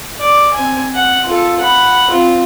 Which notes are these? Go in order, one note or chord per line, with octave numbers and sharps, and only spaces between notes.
D5
C4 G#5
F#5
F4 A4
F#5 B5
C4 F4